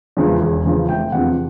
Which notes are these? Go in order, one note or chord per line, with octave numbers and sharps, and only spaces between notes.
E2 C#3 F3 G#3
E1
E2 C#3 F3
F1 G5
E2 C3 F3 F#5